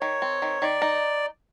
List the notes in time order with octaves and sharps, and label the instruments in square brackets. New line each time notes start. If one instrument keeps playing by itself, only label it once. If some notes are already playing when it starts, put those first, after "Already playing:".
[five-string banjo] D#3 [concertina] C#5
[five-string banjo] C4
D#3
[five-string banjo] D#3 [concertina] D5
[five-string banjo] D#4